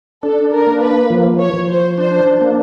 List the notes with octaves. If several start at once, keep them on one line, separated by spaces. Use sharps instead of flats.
D4 A4
A#4
A#3
B4
F3
C#5
F3
C5
D4 C5
A#3